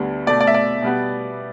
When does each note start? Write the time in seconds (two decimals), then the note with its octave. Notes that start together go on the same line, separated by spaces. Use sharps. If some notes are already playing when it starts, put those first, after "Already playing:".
Already playing: D2 D3 G3 B3
0.27 B2 A3 D5
0.41 D5
0.47 E5
0.54 D5
0.82 B2 G3 B3